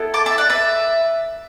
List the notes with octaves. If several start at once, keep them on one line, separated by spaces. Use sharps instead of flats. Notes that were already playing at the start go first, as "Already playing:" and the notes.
Already playing: B3 E4 A4
A5 D6
E5 A5
D5 F#5
B4 E5